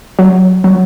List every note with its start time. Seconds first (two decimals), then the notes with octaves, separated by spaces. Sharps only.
0.19 F#3
0.64 F#3